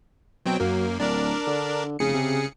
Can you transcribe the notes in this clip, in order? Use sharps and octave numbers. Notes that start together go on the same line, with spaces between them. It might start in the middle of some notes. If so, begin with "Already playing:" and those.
B2 F#3 C4 G5
F#2 F#3 A#3
D1 D4 A#4 D5
D3
F1 C#3 G#4 C#7
C3